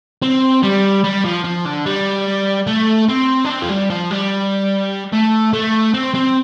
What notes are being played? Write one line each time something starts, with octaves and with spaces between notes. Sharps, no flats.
C4
G3
G3
F3
F3
D3
G3
A3
C4
D4
C4
F3
G3
F3
G3
A3
A3
C4
C4